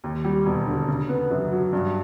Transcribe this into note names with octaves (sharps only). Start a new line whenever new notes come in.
D#2
G3
E1
D3
C#3
B3
F#2
F#3
G2